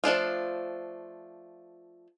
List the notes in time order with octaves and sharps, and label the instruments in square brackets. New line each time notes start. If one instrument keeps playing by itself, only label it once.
[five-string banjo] F3 A3 D4 F4